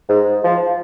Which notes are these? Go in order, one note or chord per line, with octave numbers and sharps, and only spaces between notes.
G#2
F3